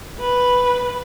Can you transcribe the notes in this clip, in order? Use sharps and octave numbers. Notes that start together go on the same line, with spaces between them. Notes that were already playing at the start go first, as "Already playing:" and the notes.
B4